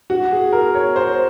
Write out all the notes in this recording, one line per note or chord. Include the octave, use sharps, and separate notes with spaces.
F#4
G#4
A#4
C#5
C5